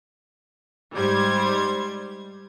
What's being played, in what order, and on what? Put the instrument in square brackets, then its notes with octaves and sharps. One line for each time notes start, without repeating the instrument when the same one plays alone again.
[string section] G#2 G3 C5 G#6